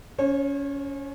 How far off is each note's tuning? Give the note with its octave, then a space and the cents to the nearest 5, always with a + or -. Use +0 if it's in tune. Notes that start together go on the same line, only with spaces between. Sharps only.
C#4 +20 C#5 -40